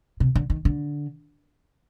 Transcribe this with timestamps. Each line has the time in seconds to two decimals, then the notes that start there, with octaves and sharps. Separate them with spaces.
0.20 C3
0.35 D3
0.50 D#3
0.65 D3